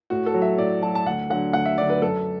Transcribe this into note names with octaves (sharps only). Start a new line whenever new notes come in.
A2 F#4
A4
F#3
E5
A2 D5
F#3 A5
A5
D2 F#5
D3 F#3 F#5
D2 F#5
E5
D3 F#3 D5
B4
F#2 A4